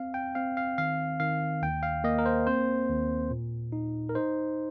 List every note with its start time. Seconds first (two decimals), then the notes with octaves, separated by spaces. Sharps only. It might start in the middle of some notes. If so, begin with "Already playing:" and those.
Already playing: C4 F5
0.14 G5
0.35 C4 F5
0.57 F5
0.78 D#3 F5
1.20 D#3 F5
1.62 D#2 G5
1.83 F5
2.04 A#3 D#5
2.19 A#4
2.26 C5
2.47 C4 C5
2.89 D#2
3.31 A#2
3.72 D#4
4.09 A#4
4.15 D#4 C5